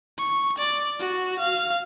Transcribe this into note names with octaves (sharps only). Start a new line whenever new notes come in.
C#6
D5
F#4
F5